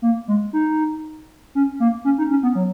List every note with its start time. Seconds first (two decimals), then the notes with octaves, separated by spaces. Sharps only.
0.02 A#3
0.28 G#3
0.53 D#4
1.55 C#4
1.80 A#3
2.05 C#4
2.18 D#4
2.31 C#4
2.43 B3
2.55 F#3